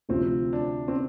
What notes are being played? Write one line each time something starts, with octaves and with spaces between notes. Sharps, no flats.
D2 C3 F3 C4
D4
C4